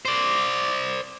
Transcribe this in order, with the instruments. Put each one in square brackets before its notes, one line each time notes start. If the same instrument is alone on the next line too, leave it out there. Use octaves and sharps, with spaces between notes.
[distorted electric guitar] C5 D5